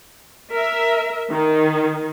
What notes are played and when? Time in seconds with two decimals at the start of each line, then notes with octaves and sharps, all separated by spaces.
0.53 A#4 E5
1.30 D#3